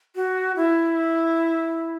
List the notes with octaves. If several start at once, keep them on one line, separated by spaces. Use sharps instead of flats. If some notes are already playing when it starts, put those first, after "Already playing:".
F#4
E4